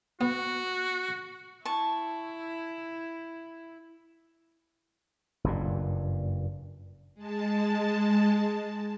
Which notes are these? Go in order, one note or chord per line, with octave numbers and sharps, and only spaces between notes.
B3 F#4
E4 A5 C#6
F#1 G2 A#2
G#3 A5